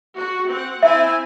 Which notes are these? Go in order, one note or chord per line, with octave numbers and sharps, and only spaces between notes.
F#4
C4 F#5
C4 E4 E5 G#5